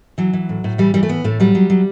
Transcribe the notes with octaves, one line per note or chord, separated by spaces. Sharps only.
E3 F#3
E3
A2
A2
E3 G3
E3 G3
A3
A2 B3
A2 A3
F#3 G3
F#3
F#3